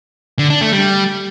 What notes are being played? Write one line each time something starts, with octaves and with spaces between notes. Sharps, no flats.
D3
D4
A3
G3